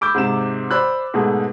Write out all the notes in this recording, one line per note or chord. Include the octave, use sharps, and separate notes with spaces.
B5 D6 E6 G6
G#2 C3 E7
C5 D5 B5 E6 F#6
G#2 B2 A3 G#4